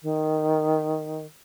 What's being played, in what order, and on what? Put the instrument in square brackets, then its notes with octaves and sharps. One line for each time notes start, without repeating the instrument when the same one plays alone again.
[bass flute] D#3